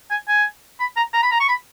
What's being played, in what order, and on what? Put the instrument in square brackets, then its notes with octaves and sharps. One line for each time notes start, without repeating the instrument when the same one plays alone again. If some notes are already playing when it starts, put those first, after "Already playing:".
[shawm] G#5
G#5
B5
A#5
A#5
B5
A#5
C#6
B5